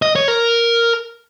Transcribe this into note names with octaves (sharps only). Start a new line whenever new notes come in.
D#5
C#5
A#4